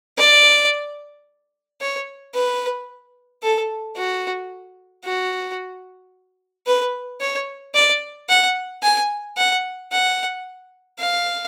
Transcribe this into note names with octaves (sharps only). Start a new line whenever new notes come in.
D5
C#5
B4
A4
F#4
F#4
B4
C#5
D5
F#5
G#5
F#5
F#5
F5